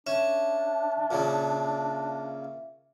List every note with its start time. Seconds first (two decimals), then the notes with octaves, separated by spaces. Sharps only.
0.07 C#4 D4 E5
1.11 A#2 C#3